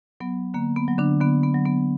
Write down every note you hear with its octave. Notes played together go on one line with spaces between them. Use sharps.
F#3 B3
D3 A#3
B3
F#3
D3 D4
D3 B3
B3
F#3
B3